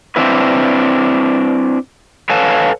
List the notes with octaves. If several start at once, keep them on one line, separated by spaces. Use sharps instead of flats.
C4 D4 E4 B4
A4 B4 C#5 F5 G#5 A5